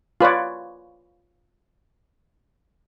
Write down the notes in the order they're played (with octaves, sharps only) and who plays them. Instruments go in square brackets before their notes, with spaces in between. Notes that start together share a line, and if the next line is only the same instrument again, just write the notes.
[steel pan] F4 B4 C#5 D5